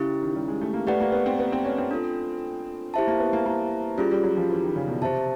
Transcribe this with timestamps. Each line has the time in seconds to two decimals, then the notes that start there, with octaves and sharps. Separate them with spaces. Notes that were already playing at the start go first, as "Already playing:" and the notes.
Already playing: C#3 C#4 E4 G4
0.23 D#3
0.35 G3
0.48 G#3
0.61 A3
0.74 A#3
0.87 A3 G4 B4 D5 F#5
1.00 A#3
1.12 B3
1.26 C4
1.39 B3
1.52 C4
1.65 C#4
1.78 C4
1.91 D4 F4 A4
2.94 E4 G4 C5 E5 A5
3.07 A#3
3.20 B3
3.33 A#3
3.46 A#3
3.98 G3 C#4 F4 G#4
4.11 G3
4.24 F#3
4.37 F3
4.50 E3
4.63 D#3
4.76 C#3
4.88 B2
5.02 C3 G4 C5 E5 A5